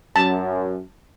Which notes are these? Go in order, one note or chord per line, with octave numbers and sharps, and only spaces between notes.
F#2 A5